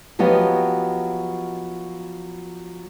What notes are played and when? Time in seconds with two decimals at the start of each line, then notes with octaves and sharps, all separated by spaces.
0.19 F3 F#3 B3 G4 D#5